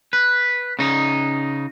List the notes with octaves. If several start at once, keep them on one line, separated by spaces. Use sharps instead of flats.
B4
C#3 D#4